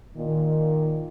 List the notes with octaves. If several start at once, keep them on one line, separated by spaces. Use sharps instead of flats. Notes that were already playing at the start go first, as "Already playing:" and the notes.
A#2 D#3